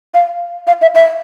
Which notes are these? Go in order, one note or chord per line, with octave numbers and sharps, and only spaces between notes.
F5
F5
E5
E5